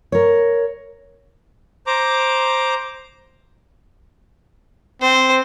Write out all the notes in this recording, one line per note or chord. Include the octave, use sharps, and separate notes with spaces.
A#4 C#5
C5 A#5 D6
C4 C5